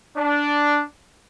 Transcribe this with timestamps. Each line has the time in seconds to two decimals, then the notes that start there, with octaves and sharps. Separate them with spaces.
0.17 D4